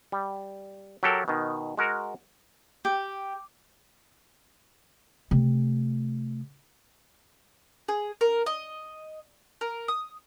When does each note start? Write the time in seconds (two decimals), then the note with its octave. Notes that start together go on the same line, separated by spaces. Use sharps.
0.12 G3
1.03 F#3 G4 A4 A#4
1.28 B2 D#3
1.77 G#3 F#4 A#4
2.85 G4
5.31 C3 A3
7.88 G#4
8.21 A#4
8.46 D#5
9.61 A#4
9.88 D#6